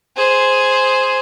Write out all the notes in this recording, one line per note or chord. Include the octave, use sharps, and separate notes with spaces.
G#4 C5